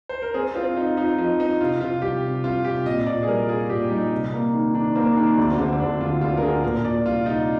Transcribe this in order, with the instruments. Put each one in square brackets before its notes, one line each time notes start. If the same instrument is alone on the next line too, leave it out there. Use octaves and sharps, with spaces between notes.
[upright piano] C5
A#4
[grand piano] C4 [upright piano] G#4
[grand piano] C4 [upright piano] F4
[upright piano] D#4 [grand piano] F4
[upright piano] D#4 [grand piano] F4
[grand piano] F3 [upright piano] D#4
[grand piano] C4 [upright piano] D#4
[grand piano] C3 [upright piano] F4
[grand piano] C3 [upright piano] F4
[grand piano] C2 [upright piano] G4
[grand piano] C3
[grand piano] C2 [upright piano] F4
[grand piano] C3 [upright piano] G4
[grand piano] A#2 [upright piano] D#5
[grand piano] A#2 [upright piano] D5
[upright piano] G#4
[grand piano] G3 [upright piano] A#4
[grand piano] F4 [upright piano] G#4
[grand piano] A#2 [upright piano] G4
[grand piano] G3 [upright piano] D#4
[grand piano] C3
A#3
D#3
[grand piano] D#3 [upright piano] D4
[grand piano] A#3 [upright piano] C4
[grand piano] D#3 [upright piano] D4
[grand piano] D2 [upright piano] D4
[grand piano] D3 [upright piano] C4
[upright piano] C4
[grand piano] D2 [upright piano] D4
[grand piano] D2 [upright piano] F4
[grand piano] D2 [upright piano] F4
[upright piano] A#4
[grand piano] D3 [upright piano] G#4
[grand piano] A#2 [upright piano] A#4
[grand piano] A#2 [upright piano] D5
[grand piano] C2 [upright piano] F4
[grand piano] C2 [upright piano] D#4